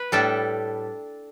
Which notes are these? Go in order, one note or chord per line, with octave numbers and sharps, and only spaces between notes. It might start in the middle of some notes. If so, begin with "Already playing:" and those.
Already playing: B4
A2 G3 D4 A4